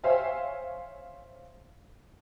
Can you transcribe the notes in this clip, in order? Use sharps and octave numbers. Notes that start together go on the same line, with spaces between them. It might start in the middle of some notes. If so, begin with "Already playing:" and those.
C5 C#5 E5 F5 G5 G#5